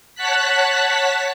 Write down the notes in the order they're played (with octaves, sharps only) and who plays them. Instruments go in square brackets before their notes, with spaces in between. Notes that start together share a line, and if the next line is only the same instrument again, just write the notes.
[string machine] C#5 F#5 A5 F#6 B6